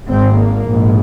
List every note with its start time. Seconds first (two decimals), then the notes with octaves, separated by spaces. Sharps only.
0.09 G#1 G#2 C4
0.38 A#3
0.67 A#1 G#2